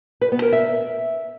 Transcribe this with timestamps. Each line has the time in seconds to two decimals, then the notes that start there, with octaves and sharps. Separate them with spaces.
0.21 B4
0.32 B3
0.42 A#4
0.53 E5